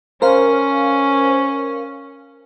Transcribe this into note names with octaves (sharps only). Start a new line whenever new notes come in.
C#4 A#4 C5 F5